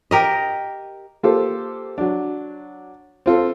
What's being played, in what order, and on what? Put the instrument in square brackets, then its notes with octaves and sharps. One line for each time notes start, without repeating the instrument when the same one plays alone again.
[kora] G4 A#4 D#5
[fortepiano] A#3 F4 G4 A4 C5
F#3 D4
C4 F4 A4